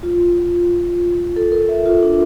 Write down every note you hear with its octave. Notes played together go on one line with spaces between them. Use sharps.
F4
A4
A#4
E5
F4
D4